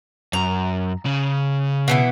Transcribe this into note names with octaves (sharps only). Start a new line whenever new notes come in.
F#2 A#5
C#3
B2 E3 B3